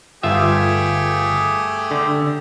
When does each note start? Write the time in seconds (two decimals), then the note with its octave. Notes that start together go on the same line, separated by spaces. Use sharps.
0.23 G1 A3 F4 G4 G#4 E5
1.91 D3